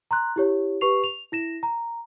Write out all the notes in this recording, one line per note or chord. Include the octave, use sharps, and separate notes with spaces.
A#5 C6 F#6
E4 G4 C#5
G4 B4 C#6 C7 F7
F7
E4 A#6 E7
A#5